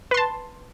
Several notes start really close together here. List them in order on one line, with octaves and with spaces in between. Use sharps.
B4 C6 A5